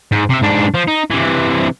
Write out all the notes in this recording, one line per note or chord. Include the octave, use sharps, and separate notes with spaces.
G#2
C3 E5
G#2 D4
F3
D#4
C3 E3